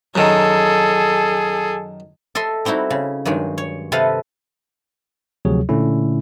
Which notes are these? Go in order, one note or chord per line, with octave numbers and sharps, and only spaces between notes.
F#2 D#3 G#4 A4
A4 D#5 E5 C6
G3 C4 D#4 E4 F#4
C#3
G2 D#3 F#3 G#3
C#5
C3 C4 A4 B4 D#5 F5
D2 C3 F3 F#3 G#4 C#5
A#2 D3 A3 C#4 E4